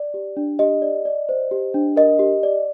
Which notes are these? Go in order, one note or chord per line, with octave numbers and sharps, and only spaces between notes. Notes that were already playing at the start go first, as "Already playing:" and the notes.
Already playing: D5
G4
D4
G4 D#5
D5
D5
C5
G4
D4
A#4 D#5
G4
D5